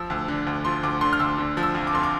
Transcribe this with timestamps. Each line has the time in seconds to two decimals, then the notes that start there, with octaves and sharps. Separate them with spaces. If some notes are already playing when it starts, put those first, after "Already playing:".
Already playing: F3 E6
0.10 D2
0.28 D3
0.47 D2
0.65 F3 C6
0.83 D2 D6
1.01 D3 C6
1.13 F6
1.19 D2 E6
1.38 D3
1.57 F3
1.63 E6
1.75 F2
1.87 D6
1.93 F1 C6
2.03 D6